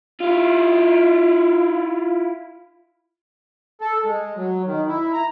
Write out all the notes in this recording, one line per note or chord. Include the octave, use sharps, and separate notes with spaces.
E4 F4
A4
G#3
F#3
D#3
E4
A#5